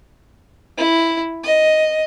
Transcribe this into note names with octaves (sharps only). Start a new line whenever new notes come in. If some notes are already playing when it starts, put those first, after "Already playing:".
E4
D#5